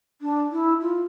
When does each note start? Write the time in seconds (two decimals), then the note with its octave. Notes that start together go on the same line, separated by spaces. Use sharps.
0.22 D4
0.51 E4
0.81 F4